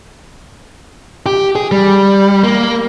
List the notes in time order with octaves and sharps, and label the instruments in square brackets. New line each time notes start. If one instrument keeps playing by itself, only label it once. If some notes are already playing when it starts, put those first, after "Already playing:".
[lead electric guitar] G4
G#4
G3
A#3